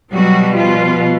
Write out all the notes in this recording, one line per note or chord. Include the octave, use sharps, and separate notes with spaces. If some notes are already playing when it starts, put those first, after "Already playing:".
B2 F#3 G3 F#4
F3 F4